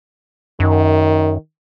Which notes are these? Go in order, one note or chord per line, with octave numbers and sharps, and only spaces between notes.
F#2 D#3